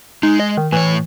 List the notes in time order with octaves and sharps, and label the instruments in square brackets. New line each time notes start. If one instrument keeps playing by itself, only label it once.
[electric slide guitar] G#3 [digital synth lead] D#4
[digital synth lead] D#5
D#3
[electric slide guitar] A2 C#5 [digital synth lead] E3